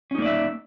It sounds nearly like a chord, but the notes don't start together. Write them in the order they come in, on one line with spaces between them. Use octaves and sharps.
C#4 D#4 A#3 D5 E5